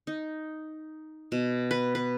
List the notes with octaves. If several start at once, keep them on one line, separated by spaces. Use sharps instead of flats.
D#4
B2
B4
B4